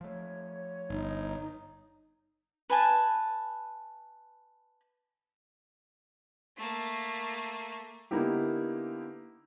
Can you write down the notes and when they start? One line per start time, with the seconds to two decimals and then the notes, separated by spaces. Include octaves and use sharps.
0.01 F3 A3 C#5
0.90 G1 D#4
2.70 B4 G#5 A5
6.57 A3 A#3
8.11 D3 A#3 B3 D#4 E4 G4